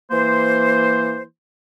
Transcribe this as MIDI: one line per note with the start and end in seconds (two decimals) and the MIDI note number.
0.11 1.21 52
0.11 1.21 58
0.11 1.21 72